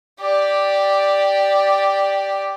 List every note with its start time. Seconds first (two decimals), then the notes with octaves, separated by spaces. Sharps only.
0.20 G4 D5